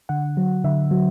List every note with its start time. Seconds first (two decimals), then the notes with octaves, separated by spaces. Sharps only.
0.09 D3 F#5
0.37 F#3
0.64 D3 E5
0.91 F#3